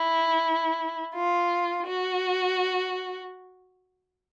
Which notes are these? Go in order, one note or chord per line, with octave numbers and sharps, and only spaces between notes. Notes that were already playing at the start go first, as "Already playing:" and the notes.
Already playing: E4
F4
F#4